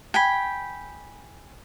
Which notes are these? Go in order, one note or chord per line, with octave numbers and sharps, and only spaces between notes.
G5 G#5 B5